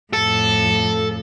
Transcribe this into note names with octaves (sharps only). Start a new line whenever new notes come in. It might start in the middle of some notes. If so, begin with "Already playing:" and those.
F2 A2 A4